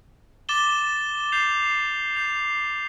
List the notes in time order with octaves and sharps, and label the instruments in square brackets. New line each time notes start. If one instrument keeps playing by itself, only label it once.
[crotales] D6 A6 E7 G7
G6 C7 F7
G6 C7 F7